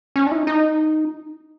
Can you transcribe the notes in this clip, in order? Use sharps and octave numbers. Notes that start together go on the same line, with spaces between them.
C#4
D4
E4
D#4
D#4